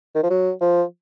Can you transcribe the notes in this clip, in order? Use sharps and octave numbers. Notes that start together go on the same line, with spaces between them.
D#3
F3
F#3
F3